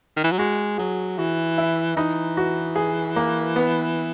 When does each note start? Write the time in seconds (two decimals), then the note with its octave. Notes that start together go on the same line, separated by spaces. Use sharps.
0.17 D#3
0.24 E3
0.32 F#3
0.39 G#3 F#4
0.78 F#3 G#4
1.18 E3 F#4
1.58 E4
1.97 E3 D#4
2.37 F#4
2.76 G#4
3.16 A#3
3.56 B3